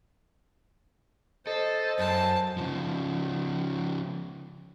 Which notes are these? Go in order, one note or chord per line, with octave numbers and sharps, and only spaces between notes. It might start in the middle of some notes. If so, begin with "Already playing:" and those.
A4 C5 D#5
F#2 C5 A5
C#3 F3